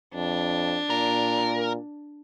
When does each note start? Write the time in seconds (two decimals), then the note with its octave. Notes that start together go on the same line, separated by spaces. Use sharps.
0.14 F2 D4
0.90 A#2 A#4